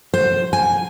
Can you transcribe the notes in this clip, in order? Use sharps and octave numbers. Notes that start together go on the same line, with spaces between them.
C5
G#5